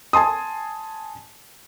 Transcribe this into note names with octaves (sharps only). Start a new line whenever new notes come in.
G#5 A5 C6 D#6